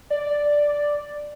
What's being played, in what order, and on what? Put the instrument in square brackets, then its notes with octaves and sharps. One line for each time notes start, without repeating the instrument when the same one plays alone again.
[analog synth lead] D5